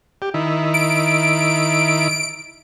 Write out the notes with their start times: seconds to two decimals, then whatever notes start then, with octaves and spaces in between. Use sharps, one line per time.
0.22 G4
0.34 D#3 E4
0.74 D7